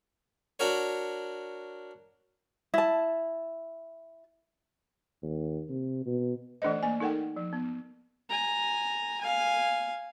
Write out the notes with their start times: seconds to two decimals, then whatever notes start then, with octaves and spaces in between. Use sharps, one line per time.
0.59 D4 F#4 A#4 C#5
2.74 E4 A5
5.22 D#2
5.69 C3
6.06 B2
6.62 E3 A3 D4 A4 C5 D#5
6.83 A#3 G#5
7.00 D#4 A4 A#4 F#5 G5
7.36 F3
7.53 B3
8.29 G#5 A#5
9.20 F5 G#5